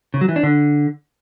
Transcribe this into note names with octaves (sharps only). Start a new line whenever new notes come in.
C#3
F#3
E3
D4
D3